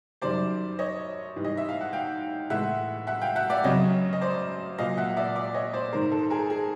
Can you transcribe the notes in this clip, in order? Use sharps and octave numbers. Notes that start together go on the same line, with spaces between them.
F#2 D#3 G3 C5 D5
C#5 D#5
G#2 E3 G3
D#5
E5
F5
F#5
F5 G5
A2 E3 G#3 E5 F#5
E5 F#5
F5 G5
E5 F#5
D5 E5
F#2 C#3 F#3 C#5 D#5
D#5
C5 D5
A#2 F#3 D#5 F5
E5 F#5
D5 E5
D5 E5
C#5 D#5
C5 D5
G#2 D#3 G#3 A#4 C5
A4
G#4 A#4
G#4